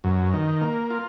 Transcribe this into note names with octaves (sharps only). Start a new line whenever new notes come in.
F#2
D#3
A#3
F4